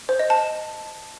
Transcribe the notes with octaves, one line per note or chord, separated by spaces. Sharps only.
C5
D#5
A5